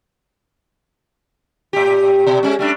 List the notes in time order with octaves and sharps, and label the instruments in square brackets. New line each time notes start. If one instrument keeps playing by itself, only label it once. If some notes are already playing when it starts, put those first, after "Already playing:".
[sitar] A2 G4
B2
G#3 C#4
G3 A3 D4